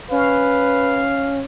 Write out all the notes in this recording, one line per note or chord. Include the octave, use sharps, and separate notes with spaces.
C#4 B4 F5